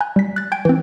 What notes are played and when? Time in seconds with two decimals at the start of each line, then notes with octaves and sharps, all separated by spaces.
0.01 G#5 A#5 F#6 G6
0.16 G3 B6
0.36 F#6 A6
0.52 G5 G#5 G6 G#6 D7
0.65 E3 C4